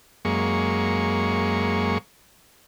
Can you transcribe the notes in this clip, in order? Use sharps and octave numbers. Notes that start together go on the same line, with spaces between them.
F#2 G#3 A#3 C#6